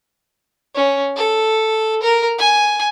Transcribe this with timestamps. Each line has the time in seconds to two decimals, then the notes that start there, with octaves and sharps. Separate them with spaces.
0.75 C#4
1.16 A4
2.02 A#4
2.38 G#5